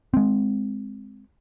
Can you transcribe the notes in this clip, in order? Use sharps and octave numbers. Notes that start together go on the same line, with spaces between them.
G#3 C4